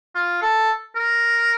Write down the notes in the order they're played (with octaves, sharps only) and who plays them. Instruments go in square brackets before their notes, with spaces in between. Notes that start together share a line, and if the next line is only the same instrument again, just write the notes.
[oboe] F4
A4
A#4